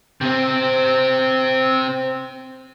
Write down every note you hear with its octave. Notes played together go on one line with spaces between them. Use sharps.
C3 C4